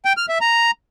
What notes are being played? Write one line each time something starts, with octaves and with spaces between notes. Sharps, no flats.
G5
F6
E5
A#5